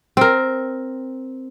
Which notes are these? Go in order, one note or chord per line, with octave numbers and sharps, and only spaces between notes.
C4 A#4